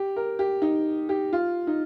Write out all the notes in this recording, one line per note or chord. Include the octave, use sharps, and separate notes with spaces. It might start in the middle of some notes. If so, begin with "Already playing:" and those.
Already playing: G4
A#4
G4
D#4
G4
F4
D#4